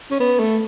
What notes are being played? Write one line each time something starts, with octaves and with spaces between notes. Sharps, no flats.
C#4
B3
A3